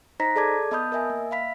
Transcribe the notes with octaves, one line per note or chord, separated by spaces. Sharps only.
D#4 C5 D#5 A#5 A#6 B6
G#4 A4 D5 A5 D6 G#6
B3 D#5 A5 B5 D#6 G6
A#4 D#5 E5 G#5
A#3
E5 F5 B5 B6